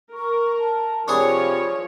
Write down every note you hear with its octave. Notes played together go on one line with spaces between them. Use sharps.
A#4 C#6
A5
C3 F3 D4 G#4 C#5 B5 C#6